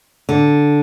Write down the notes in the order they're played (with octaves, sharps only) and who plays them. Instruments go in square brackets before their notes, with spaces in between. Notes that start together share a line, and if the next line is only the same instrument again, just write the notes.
[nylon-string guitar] D3